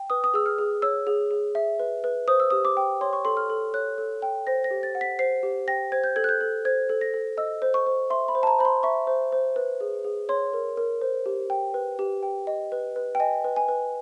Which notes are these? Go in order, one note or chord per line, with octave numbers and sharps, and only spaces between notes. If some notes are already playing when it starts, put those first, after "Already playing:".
Already playing: G5
B4 D#6
D#6
G#4 E6
F6
G#4
C#5 E6
G#4
G#4
E5
B4
B4
C5 D#6
E6
G4 D#6
D6
G5
C#5 C6
C#6
A4 C6
F6
A4
C#5 F#6
A4
G5
C5 A#6
A#6
G4
A6
F#5
B6
C5 C7
G4
G5 A#6
C5 G#6
G6
A4 G#6
F#6
G6
A4
C5 G#6
A4
A#6
A4
D#5 E6
C5
C#6
C5
E5 C6
B5
C5
A5
A#5
C5 B5
C6
E5 C#6
C5
C5
B4
G#4
G#4
C#5 C6
A#4
A#4
C5
G4
G5
B4
G4
G5
D#5
B4
B4
G5
D#5 G#5
B4
G#5
B4